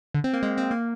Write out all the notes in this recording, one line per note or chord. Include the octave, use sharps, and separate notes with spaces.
D3
C4
A#3
G#3
C4
A#3